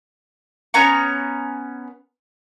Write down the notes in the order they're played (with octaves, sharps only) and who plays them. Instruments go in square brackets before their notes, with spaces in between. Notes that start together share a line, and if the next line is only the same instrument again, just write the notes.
[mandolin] B3 C#4 A#5 C#6